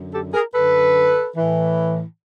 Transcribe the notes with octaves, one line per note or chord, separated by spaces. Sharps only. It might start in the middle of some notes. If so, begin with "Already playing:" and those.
Already playing: F#2 D3
G4 A4
G#4 A#4
F#2 D3 A4 B4
A2 E3